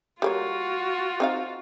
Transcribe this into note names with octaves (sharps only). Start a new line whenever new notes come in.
G3 A#3 F4 F#4 C#5
C4 D#4 F5